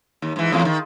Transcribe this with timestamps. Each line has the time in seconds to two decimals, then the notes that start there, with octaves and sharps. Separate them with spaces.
0.22 D#2
0.36 G#2 E3
0.51 E2 A2 F3
0.65 D#3